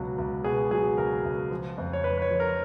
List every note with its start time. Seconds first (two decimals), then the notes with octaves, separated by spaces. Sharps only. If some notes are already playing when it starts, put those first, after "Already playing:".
Already playing: C#2 B2 F#3 F#4
0.18 C#2
0.44 B2 G#4
0.71 F#3 G#4
0.98 C#2 A#4
1.24 C#2
1.51 F3
1.78 F2
1.93 C#5
2.04 F2 B4
2.18 B4
2.22 C#5
2.31 F3
2.40 A#4